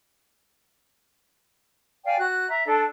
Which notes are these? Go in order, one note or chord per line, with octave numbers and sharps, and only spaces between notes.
D5 F5 G5 G#5
F#4 F#6
E5 A#5
D4 A4